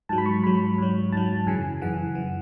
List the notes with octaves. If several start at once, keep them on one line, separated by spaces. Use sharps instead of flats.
G#2 F#3 A5
B5
C#6
G#2 F#3 B5
G#2 F#3
G#2 F#3 A5
F#2 C#3 E3 G#5
F#2 C#3 E3 F#5
E3